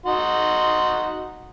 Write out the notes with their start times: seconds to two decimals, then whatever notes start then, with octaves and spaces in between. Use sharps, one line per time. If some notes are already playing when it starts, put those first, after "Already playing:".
0.06 D#4 F#4 C6